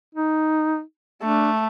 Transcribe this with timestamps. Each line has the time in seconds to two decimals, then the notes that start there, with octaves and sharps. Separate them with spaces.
0.15 D#4
1.22 A3 D4